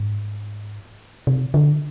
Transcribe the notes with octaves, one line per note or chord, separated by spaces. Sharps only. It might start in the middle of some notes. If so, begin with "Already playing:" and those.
Already playing: G#2
C3
D3